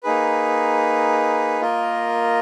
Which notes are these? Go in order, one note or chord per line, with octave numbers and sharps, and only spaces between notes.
A#3 D#4 G#4 B4
A#3 F4 A#4 D#5